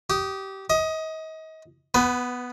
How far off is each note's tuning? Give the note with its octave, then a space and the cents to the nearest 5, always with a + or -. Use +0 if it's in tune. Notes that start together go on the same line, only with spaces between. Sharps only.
G4 -20 D#6 +0
D#5 +35 D#6 +0
B3 +0 B4 +30 G#5 +0